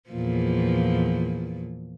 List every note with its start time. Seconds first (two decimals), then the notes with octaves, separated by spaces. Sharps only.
0.10 E2 A#2 F3